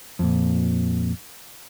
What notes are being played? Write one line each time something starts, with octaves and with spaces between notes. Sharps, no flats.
F2 A#2